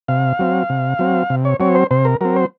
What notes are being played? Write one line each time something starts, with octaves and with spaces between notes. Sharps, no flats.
C3 F5
F#3 C4
C3
F#3 C4
C3
C#5
F#3 C4 C#5
C5
C3 C5
A#4
F#3 C4 A#4
C5